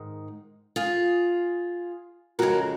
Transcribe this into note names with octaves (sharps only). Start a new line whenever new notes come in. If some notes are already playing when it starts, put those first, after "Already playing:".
Already playing: G#2 D#3 G#3
F4 G#4
F2 C#3 G#3 F#4 A#4